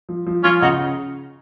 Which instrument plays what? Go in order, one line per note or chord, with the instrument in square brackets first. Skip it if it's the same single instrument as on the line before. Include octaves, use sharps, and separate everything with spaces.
[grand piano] F3
F3
[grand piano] F3 [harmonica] C#4 F4
[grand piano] C#3 [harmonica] D#4 F#4